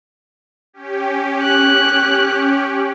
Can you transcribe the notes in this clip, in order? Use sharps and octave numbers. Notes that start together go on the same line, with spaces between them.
C#4 G4
F#6